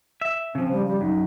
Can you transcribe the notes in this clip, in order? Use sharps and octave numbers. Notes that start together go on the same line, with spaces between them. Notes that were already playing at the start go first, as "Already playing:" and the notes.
E5
C#3 F3 C4
G3
G3
F#2 D#4